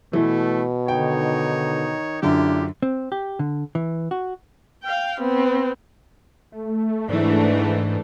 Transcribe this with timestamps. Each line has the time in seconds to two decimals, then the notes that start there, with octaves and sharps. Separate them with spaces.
0.13 B2 E3 A3
0.88 D3 D#3 D#4 C#5 G5
2.23 F#2 D3 D4 E4 F4 G4
2.83 C4
3.12 G4
3.39 D3
3.75 E3
4.11 F#4
4.84 F5 G5
5.21 B3 C4
6.52 A3
7.09 G#2 E3 A3 D4